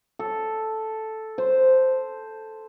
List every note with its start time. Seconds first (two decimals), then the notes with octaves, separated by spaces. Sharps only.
0.19 A4
1.38 C5